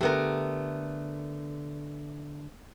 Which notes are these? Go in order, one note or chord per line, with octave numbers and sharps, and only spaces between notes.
D3 A3 B3 G4 A#4